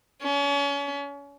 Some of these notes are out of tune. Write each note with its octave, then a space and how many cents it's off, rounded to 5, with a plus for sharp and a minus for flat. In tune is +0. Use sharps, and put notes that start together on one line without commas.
C#4 +35